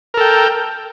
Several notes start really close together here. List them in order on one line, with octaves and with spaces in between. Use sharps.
A#4 A4 G5